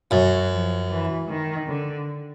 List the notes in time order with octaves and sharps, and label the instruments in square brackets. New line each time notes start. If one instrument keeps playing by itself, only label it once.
[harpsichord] F#2 [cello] F#3
[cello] F3
E3
D#3
D3